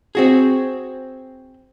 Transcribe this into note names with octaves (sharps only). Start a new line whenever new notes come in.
C4 F#4 G#4